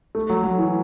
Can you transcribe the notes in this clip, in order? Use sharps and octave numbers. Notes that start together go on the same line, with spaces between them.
A3
F#3
F#3
E3